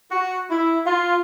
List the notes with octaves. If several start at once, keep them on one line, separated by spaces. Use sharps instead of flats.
F#4
E4
F4